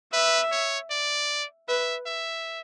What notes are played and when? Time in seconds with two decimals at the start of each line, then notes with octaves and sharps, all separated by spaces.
0.13 B4 E5
0.51 C#5
0.91 D5
1.68 B4 E5
2.06 E5